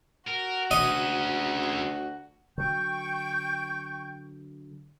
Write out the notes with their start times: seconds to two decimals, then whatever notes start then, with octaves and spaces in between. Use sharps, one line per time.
0.28 F#4 A#4
0.71 D2 G#3 C#4 D#5
2.58 D3 F#3 G5 C#6 G6